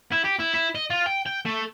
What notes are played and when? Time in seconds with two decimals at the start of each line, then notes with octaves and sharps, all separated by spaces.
0.12 E4
0.24 G4
0.39 E4
0.54 E4
0.75 D#5
0.90 F4
1.06 G5
1.26 G5
1.46 A3